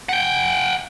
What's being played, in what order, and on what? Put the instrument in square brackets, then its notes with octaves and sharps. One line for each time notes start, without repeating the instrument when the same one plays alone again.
[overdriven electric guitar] F#5 G5